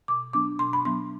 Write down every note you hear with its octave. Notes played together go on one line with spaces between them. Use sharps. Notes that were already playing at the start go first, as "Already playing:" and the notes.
B2 D6
F#3 B3 D4 D6
B2 C6
B5
F#3 B3 D4 C6